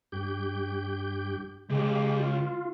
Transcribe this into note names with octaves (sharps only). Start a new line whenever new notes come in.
G2 G4 G6
C#2 G#3 G4
F4